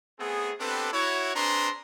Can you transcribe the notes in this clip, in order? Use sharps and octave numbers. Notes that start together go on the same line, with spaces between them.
A3 B3 C4 G#4
B3 C4 D4 G4 A4 B4
E4 F#4 C#5
C4 D4 G#4 B4 A#5 C6